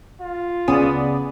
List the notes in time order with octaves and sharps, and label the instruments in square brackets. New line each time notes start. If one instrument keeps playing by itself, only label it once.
[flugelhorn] F4
[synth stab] C#2 G#4 D#6 [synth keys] C#3 D5 [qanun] B3